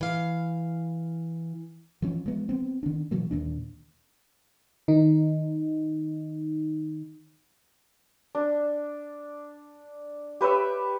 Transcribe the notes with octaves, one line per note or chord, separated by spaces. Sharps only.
E3 F5
E3 F3 C#4
F3 G#3 B3
B3 C4
D#3 D4
B2 E3 F#3 A#3
D#2 A#2 D4
D#3 D#4
D4
G4 B4 C#5 E5